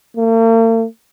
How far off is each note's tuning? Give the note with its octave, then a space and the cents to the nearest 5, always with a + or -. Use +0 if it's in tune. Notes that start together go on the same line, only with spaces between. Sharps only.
A#3 -45